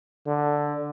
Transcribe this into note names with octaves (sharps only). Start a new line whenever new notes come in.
D3